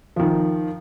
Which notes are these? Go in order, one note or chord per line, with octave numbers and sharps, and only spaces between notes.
D#3 F3